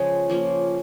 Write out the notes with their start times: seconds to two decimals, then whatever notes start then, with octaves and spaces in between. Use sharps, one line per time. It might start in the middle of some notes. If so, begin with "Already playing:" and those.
Already playing: C#3 F3 G#3 G#4 C#5
0.30 F3 A#3 C#4 F4